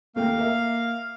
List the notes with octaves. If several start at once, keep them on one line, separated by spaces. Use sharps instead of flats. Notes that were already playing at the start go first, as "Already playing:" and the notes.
D#2 A3 A#3 F5 G5
A#4 E5